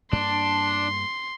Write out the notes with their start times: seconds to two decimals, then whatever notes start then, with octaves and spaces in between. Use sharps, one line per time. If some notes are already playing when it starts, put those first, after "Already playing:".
0.13 G2 A#3 D4 C6